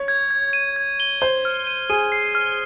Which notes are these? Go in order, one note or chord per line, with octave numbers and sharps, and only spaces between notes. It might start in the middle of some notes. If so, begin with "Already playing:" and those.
Already playing: C#5
G#6
G#6
D#7
G#6
G7
C5 G7
F6
D#7
G#4 D#7
C7
F6